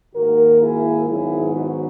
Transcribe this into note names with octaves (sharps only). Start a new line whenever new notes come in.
G#2 D#3 A#3 F#4 A#4
E4 G#4
G#2 D#3 F#3 B3 E4 G#4
D#4 F#4